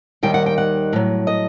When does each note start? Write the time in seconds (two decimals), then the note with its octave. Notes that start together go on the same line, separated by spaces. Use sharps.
0.23 D#2 D#3 G3 G5
0.34 F#5
0.46 G5
0.58 F#5
0.93 A2 F#3
1.27 D#5